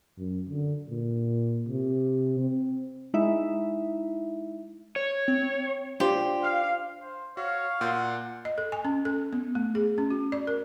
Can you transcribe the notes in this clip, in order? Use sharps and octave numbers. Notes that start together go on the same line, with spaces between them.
F#2
D3
A#2
C3
C4
G#3 D#4 E4 E5
C#5
C4
D4 F4 G4 C5
F5
C5
F#4 C#5 F5
A#2 F#5 C6 G6
D#5
A4
G#5
C#4
A4
B3
A3
G#4
C#4
F#4
D5
A#4